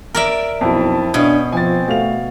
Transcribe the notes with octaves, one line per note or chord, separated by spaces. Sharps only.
A#4 D5 E5
B1 F2 E4 A5
B2 C#4 D4 E5 D#6 G#6
F3 C4 G#5 A6
A3 F#4 F5 F7